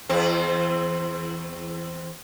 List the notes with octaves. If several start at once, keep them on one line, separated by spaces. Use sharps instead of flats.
E2 C4